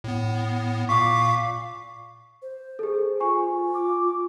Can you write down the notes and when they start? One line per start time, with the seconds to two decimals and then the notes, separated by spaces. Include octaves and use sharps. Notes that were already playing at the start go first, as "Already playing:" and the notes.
0.04 A2 B3
0.89 A#2 F5 C#6 D6 B6
2.42 C5
2.79 G#4 A4
3.20 F4 G#5 C#6
3.74 D6